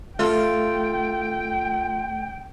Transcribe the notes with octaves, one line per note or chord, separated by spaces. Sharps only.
A3 F4 A4 G5